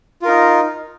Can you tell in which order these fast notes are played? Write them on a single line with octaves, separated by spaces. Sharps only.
F4 A#4 D#4